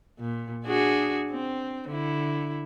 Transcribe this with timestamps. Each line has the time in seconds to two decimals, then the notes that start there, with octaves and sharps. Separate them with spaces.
0.19 A#2
0.65 D4 F#4 G#4
1.31 C4
1.89 D3 E4